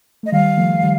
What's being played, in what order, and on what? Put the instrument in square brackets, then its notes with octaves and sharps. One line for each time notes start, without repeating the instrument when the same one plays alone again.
[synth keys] A3 [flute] D#5
[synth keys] D#3 G3 [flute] F5
[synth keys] F3 A3
D#3 G3